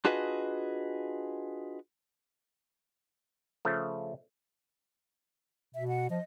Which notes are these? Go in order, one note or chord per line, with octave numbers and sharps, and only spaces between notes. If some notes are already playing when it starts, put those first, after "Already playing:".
D4 F4 F#4 G#4 B4 D#5
C#3 F3 A3
B2 E5
F#5
F3 D#5